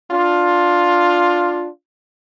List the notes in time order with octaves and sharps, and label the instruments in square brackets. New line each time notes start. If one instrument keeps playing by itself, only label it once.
[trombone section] D4 F4